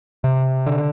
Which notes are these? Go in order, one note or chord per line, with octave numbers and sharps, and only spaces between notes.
C3
D3